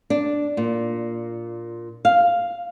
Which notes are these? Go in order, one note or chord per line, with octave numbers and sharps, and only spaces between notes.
D4
A#2
F5